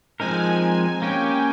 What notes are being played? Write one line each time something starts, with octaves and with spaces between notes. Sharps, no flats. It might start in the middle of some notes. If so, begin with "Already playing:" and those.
F3 G#3 C4 D#4 A#4 G#5
A#3 C#4 G4 G5